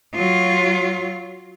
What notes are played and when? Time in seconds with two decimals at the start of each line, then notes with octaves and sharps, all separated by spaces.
0.15 F#3 F4